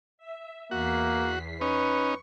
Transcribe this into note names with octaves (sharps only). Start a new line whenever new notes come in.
E5
E2 A#3 F#4 B6 C7
C#4 D#4 B4 C#6